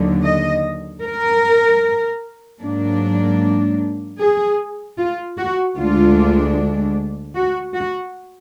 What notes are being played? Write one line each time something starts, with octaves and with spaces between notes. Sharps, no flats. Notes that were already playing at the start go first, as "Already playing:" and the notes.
Already playing: D#2 D3 F#3
D#5
A#4
G#2 F#3 A#3 D4
G#4
F4
F#4
D2 D3 G#3 D4 F4
F#4
F#4